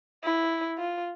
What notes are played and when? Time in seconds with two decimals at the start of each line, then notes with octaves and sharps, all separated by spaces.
0.24 E4
0.78 F4